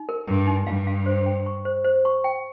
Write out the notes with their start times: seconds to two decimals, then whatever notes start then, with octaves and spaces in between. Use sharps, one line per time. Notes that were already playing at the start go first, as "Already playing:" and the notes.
Already playing: D#4
0.09 A#4
0.28 G2 A#4
0.47 D#4
0.67 G2 F5
0.87 F5
1.06 C5
1.26 G5
1.46 C#6
1.65 C5
1.84 C5
2.05 C#6
2.24 G5